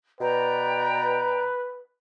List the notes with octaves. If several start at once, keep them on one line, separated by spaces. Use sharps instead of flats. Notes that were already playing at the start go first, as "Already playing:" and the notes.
B2 B4 D5 G5 A#5